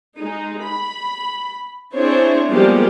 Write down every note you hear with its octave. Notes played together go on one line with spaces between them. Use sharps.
G#3 D#4
B5
C4 D4 E4 G#4 C5 C#5
F3 G3 G#3 A#3 B3 G4